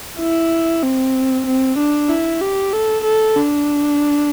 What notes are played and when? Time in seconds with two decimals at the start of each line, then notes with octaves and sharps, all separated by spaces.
0.20 E4
0.84 C4
1.47 C4
1.78 D4
2.10 E4
2.41 G4
2.73 A4
3.05 A4
3.37 D4